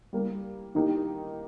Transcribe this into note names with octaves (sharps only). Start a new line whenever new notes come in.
G3 A#3 G4
D#3 A#3 D#4 G4